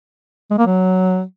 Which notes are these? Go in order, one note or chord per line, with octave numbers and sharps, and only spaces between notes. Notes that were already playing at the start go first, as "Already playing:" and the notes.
G#3
A#3
F#3